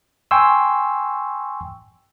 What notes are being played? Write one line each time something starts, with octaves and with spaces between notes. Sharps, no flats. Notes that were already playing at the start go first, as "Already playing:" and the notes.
G5 G#5 C6 C#6 E6